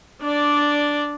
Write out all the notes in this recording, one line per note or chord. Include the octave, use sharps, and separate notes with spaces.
D4 D5